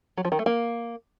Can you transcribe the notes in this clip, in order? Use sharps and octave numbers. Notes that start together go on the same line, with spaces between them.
F#3
F3
D#3
A3
A#3